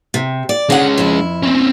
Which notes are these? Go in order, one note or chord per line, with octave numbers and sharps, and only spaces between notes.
C3
D5
D3 G#3 C#4 F#5
F2 E4
C4 C#4